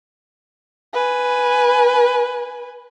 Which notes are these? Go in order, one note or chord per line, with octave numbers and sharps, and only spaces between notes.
B4 G#5